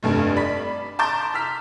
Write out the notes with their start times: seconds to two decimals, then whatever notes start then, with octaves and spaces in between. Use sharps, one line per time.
0.03 F1 G2 A3
0.36 D5 B5 B6
0.99 A5 A#5 C6 D6 G6 A6
1.34 E6 F6 B6